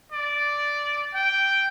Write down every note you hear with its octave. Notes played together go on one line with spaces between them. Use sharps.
D5
G5